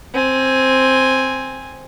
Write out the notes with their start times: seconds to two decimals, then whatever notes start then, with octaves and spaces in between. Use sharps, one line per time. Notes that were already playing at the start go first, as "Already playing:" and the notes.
0.13 C4 G#5